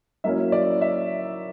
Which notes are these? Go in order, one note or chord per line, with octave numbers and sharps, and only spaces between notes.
F#3 A#3 C#4 E4 E5
D5
E5